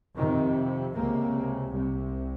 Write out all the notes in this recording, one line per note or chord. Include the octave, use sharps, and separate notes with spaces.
F2 C3 D#3
C#2 C3 A#3
C2 C3